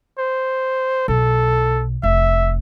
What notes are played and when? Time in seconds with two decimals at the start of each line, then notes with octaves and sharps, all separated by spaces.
0.19 C5
1.08 B1 A4
2.03 F1 E5